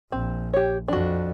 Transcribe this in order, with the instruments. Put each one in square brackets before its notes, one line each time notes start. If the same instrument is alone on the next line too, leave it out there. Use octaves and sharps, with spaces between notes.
[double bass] A#1 [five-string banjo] C4
[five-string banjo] G4 C#5
[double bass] F2 [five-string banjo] D4 F#4